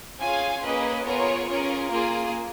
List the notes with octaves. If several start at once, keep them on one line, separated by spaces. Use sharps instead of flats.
C#4 F4 G#4 F5 G#5
A#3 C#4 G#4 B4 D#5
B3 F4 G#4 A#4 C#5
C#4 F4 G#4 A#4
A#3 F4 G#4